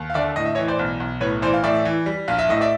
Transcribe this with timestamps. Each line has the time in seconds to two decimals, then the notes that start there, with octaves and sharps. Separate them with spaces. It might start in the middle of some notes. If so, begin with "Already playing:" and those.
Already playing: D#2
0.10 F5
0.14 D3 D5 E5
0.36 A2 D#5
0.45 E5
0.55 C#5 D#5
0.58 E3
0.68 C5 D5
0.79 B1
1.00 B1
1.21 A2 B4 C#5
1.42 E3 C5 D5
1.53 F5
1.63 A2 D5 E5
1.85 E3
2.06 G3
2.28 A#1 F5
2.39 E5
2.49 A2 D#5
2.61 D5 E5